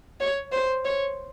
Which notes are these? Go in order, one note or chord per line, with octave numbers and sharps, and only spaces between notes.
C#5
C5
C#5